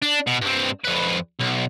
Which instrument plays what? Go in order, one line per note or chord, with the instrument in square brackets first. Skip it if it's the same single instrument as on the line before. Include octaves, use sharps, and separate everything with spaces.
[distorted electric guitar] D4
B2
G2 C4
F2 B4
B1